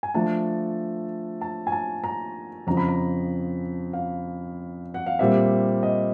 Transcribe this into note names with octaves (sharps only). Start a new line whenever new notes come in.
G#5
D3 F3 A3 D4 A5
A5
G#5
A5
A#5
F2 C#3 F3 A#5
B5
A#5
F5
F#5
F5
A#2 G3 C4 E5
D#5